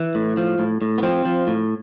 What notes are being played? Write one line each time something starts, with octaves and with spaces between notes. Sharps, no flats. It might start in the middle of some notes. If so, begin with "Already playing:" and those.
Already playing: E3
A2
F3
A2
A2
B3
F3 C4
F3
A2